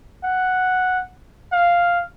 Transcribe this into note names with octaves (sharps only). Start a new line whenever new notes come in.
F#5
F5